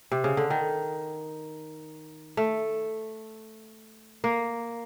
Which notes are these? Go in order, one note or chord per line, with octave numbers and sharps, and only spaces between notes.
C3
C#3
D3
D#3
A3
A#3